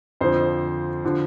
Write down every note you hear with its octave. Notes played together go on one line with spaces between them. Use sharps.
F2 D3 F3 C5
D3 F3